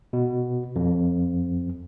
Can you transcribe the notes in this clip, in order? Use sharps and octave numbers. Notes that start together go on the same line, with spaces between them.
B2
F2